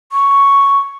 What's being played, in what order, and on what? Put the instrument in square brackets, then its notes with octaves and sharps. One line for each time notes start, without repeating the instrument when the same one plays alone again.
[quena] C#6